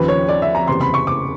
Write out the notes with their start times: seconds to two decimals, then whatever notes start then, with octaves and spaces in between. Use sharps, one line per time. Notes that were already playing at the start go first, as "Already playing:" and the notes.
Already playing: D#2 C#3 F3 B4
0.08 C#5
0.29 D5
0.42 E5
0.55 A#5
0.67 F#1 E2 C3 C6
0.81 B5
0.94 C#6
1.07 D6